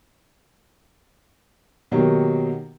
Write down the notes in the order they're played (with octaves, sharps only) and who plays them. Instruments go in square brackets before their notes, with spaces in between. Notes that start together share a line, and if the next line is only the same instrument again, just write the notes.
[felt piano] B2 D#3 F#3 A#3 F#4 G4